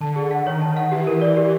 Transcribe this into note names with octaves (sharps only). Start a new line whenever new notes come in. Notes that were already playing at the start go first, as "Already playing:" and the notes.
D3 A5
G#4
F#5
D#3 C#5
A5
F#5
E3 G4
A#4
D5
G4